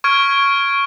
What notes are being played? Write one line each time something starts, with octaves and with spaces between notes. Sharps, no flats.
C#6 F6 G#6 D7
D7